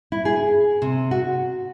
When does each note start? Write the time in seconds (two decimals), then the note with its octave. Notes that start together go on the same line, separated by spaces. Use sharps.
0.12 E4
0.25 G#4
0.82 C3
1.11 F#4